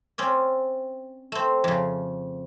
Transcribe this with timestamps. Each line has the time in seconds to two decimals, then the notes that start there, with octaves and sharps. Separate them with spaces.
0.18 C4 C#4 D5
1.32 A3 C4
1.64 F2 C#3